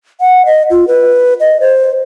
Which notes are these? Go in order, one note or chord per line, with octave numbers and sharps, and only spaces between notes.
F#5
D#5
F4
B4
D#5
C5